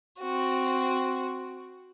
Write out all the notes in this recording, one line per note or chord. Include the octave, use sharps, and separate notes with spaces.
C4 F#4